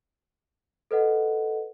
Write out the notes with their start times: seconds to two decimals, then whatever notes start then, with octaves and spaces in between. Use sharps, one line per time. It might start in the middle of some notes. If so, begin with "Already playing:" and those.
0.91 A4 B4 D#5 F#5